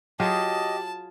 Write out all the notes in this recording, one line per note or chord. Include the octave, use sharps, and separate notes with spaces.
F#3 F4 G4 G#4 D#5 A5